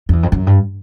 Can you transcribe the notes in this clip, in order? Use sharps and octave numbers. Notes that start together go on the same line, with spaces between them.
F2
E2
F2
F#2
G2